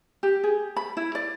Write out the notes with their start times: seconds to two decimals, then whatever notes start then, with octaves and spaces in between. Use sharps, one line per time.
0.23 G4
0.44 G#4
0.76 B5
0.97 E4
1.15 D5